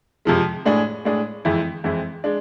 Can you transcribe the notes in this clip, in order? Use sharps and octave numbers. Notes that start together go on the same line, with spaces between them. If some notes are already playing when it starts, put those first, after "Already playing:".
F2 C3 F3 G#3
A2 G#3 D4 G#4
A2 G#3 D4 G#4
F2 E3 G#3 C4 E4
F2 E3 G#3 C4 E4
G#3 D4